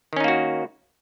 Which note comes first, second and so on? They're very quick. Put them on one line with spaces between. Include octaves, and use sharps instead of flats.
D#3 C#4 D#4 A#3 F#4